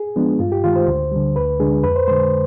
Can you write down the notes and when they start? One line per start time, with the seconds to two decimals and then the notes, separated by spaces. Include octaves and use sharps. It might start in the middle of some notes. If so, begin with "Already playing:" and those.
Already playing: G#4
0.16 F3 G#3 B3 D4
0.39 G2 F4
0.52 G4
0.64 D#3 G#3 F4
0.76 C5
0.88 D2
1.12 D3 G3
1.36 D2 B4
1.60 D3 G#3 D4 G#4
1.83 F2 B4
1.96 C5
2.08 D3 G#3 C5